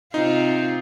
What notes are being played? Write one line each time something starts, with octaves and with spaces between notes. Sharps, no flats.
C3 C4 D#4 F4